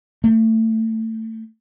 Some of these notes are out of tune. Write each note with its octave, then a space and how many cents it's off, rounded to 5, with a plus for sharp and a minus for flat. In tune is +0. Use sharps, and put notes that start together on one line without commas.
A3 +25